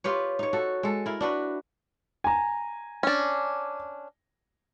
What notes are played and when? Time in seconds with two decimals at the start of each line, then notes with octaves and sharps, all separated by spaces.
0.04 F4 G4 B4 C#5
0.39 D#4 C#5
0.53 F#4 A4
0.83 G#3 A4
1.06 E4 A#4
1.21 D4 F#4 B4
2.24 G#5 A#5
3.03 C#4 D4